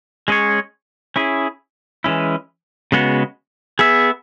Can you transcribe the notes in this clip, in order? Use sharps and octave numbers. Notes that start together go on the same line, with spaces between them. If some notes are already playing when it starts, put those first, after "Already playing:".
G#3 C#4 G#4 C#5
C#4 E4 G#4
E3 G#3 C#4 E4
C#3 G#3 B3 F#4
B3 G#4 E5